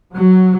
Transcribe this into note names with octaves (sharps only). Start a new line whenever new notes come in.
F#3